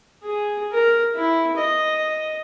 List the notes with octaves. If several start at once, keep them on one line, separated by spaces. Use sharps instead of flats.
G#4
A#4
E4
D#5